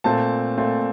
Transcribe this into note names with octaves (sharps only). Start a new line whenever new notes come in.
A#2 A3 C4 A5
A#2 A3 C4